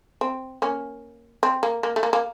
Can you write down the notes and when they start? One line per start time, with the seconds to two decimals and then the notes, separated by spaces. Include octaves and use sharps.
0.21 C4
0.62 A#3 C#4
1.43 C4
1.63 A#3
1.83 A#3
1.96 A3
2.03 A#3
2.13 A#3